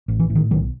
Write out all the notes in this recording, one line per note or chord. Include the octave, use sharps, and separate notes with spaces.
A1
E3
A2
D#3
B1 D#3 F#3